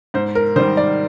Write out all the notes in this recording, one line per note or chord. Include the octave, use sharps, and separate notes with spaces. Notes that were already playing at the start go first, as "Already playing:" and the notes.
G#2 C5
A#4
D#3 G3 C5
D5